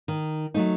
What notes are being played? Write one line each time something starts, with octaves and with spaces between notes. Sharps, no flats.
D#3
F#3 A3 D#4